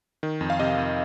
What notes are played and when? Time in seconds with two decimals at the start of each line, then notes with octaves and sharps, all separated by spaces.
0.23 D#3
0.41 F2
0.50 F5
0.60 C3 D#5
0.78 F2